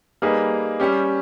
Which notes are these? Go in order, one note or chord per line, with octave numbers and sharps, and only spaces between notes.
G3 A#3 D#4 G#4 B4
G3 C#4 G4